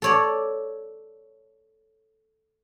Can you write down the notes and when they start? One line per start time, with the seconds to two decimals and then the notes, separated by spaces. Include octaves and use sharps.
0.02 A4 C#5 D5